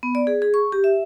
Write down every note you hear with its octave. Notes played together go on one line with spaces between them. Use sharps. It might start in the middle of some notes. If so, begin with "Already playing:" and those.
B3
D5
G#4
G#4
C#6
G4
E5